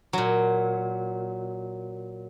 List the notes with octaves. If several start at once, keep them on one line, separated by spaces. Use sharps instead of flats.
A#2 F#3